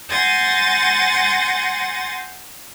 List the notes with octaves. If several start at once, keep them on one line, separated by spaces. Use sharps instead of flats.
F#5 G#5 C6 G6 A6 A#6